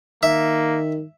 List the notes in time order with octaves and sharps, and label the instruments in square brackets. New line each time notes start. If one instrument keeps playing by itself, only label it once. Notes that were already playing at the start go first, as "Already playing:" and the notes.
[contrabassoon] D#3 [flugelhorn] A#3 [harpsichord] E5